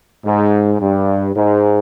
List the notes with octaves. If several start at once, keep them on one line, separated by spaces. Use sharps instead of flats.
G#2
G2
G#2